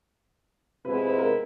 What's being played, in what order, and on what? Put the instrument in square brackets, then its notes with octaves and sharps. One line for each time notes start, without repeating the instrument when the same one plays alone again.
[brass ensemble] C3 F3 G#3 B3 E4 [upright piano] B4
[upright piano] B4
A#4